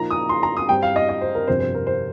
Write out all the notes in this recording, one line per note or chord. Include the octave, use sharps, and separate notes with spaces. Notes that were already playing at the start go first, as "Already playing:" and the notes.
Already playing: A#2 F3 A#3 D#4 A#5
D#6
C6
A#5
D#6
G2 G3 C4 G5
F5
D#5
D#5
C5
A#4
G1 F2 C3 C5
C5
A#4
C5